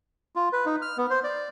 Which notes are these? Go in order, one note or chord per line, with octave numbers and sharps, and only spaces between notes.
F4
B4
D#4
F6
B3
C5
D5